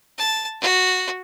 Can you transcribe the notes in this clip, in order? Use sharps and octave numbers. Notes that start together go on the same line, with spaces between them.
A5
F#4